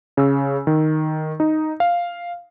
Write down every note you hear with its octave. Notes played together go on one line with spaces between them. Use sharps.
C#3 E6
D#3
D#4
F5